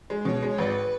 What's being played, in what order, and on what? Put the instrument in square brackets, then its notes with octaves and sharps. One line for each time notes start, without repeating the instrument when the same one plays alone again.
[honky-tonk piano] G#3
[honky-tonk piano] B2 [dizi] C#5
[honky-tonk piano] G#3
[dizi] C#5
[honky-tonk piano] G#1 [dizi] B4